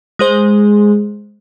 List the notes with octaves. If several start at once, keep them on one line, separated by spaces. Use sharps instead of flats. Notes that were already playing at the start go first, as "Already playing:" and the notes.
G#3 G#4 C5